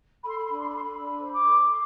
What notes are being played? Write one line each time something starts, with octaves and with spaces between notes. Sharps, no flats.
A4 B5
C6
B5
D4 C6
B5
C6
B5
A4 C6
B5
D4 B5
C5
D6
A4
C6